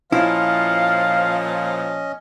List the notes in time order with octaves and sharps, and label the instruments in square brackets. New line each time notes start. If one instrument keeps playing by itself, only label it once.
[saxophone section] A#2 F3 [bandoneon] C#4 D#5 [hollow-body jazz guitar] E4 [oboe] F5